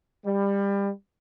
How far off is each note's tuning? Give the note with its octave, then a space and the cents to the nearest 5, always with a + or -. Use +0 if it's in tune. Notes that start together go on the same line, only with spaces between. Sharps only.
G3 +25